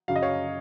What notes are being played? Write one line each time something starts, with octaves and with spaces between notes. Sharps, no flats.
F#2 C#3 F#3 F5
D#5
C#5 F5